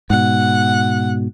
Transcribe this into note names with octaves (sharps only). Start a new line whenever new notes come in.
G#2 B2 F#5